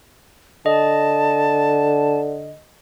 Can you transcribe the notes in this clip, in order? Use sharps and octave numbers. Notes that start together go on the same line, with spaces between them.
D3 D#5 A5